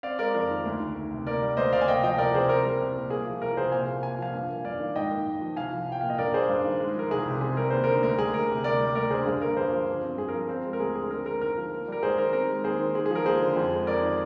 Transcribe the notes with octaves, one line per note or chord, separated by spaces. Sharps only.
C4 D5 F5
G#3 A#4 D5
F2 A#4
D#3
D2
D#3
D2
C3
A#3 A#4 D5
G3
D2 C5 D#5
C3 D5 F5
G#5
A#3 D#5 G5
F3 D#5 G5
C2 A#4 D5
C3 G#4 C5
C4 A#4
G3 A#4
C2
A#2
A#3 G#4
F3
C2 A#4
C3 G#4 C5
A#2 F5 G#5
A#3
A#2 G#5
F3 F5 G#5
G2
A#3
G2 D5 F5
D#3
G#2 D#5 G5
A#3
G#2
F3
C2 F5 G#5
F3
C2 G5
A#2 F5
D#5
G2 A#4 D5
A#3 G#4 C5
G2
D#3
G#3
F3 A#4
C2 G#4
C3
C4 G#4
G3 A#4
D#2 C5
D3 A#4
D2 A#4
G3 G#4
D2 A#4
C3
D2 A#4 D5
G3
D2 A#4 D5
D3 G#4 C5
G2 G#4
A#3 A#4
G2 G#4 C5
F3
G2
C4
G2 G#4
A#4
F3
A#4
C4
G#3
A#4
D2 G#4
D3 G#4
C4 A#4
G#3 A#4
G#2 A#4
F3
A#3
G3 A#4
G#2 G#4 C5
D#3 A#4
C4 A#4
G#3
D#2 G#4 C5
D#3
G#3 G#4
G#4
F3 A#4
D#2 G#4 C5
D3
F2
G#3
F2 A#4 D5
D#3